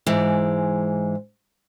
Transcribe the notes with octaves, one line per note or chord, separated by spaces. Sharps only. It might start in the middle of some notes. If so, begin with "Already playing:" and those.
G#2 E3 G#3